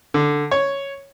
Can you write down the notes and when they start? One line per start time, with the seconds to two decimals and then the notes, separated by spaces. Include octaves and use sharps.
0.14 D3
0.51 C#5